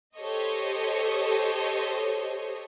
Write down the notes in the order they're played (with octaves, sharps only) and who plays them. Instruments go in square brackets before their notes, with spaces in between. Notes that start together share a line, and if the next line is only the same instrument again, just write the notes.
[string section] G4 A4 C5 C#5 D#5